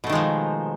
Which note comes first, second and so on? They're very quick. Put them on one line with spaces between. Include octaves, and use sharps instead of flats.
B2 A3 D#3 G#3 F3